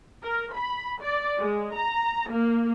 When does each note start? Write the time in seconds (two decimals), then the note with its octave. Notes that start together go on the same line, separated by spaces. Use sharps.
0.23 A#4
0.54 B5
1.02 D5
1.38 G#3
1.74 A#5
2.31 A#3